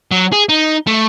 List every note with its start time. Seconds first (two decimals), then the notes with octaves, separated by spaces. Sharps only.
0.12 F#3
0.32 G#4
0.49 D#4
0.87 A3